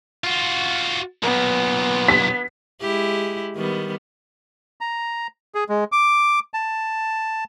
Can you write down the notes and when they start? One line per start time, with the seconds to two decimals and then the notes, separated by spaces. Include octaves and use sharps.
0.24 F4 F#4
1.23 B1 A#2 B3
2.08 B6
2.81 G#3 E4 G4
3.56 D#3 G3 B3
4.81 A#5
5.55 G#4
5.69 G#3
5.92 D6
6.54 A5